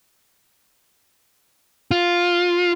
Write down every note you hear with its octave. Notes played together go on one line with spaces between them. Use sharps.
F4